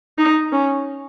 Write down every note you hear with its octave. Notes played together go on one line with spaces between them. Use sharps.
D#4
C#4